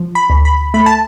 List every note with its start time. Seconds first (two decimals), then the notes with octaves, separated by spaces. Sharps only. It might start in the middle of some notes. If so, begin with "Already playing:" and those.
Already playing: F3
0.15 B5
0.30 D2
0.45 B5
0.74 A3 B5
0.86 A5